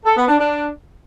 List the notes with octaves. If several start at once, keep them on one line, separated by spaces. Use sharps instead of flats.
A4
B3
D4
D4